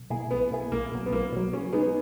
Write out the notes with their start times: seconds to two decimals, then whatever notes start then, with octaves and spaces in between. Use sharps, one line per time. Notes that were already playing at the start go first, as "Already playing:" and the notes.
Already playing: B1
0.10 B2 A#3 E4 G#4
0.31 B1 B3
0.51 B2 A#3 E4 G#4
0.72 B1 A#3
0.92 B2 F#3
1.06 B3
1.12 B1 A#3
1.32 B2 F#3
1.53 C#3 C#4
1.73 G#3 B3 D#4 G#4